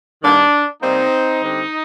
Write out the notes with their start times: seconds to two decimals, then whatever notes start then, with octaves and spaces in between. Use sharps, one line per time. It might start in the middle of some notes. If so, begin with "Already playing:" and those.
0.23 G2 D#3 A#3 D4
0.81 C3 G3 A#3 C4 D#4
1.41 D3 G3 C4